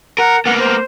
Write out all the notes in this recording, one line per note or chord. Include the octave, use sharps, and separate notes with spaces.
A#4 F#5
A#3 B3 F#5
C5